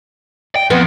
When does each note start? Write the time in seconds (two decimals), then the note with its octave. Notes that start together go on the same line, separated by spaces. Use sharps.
0.56 G5
0.70 F2 B3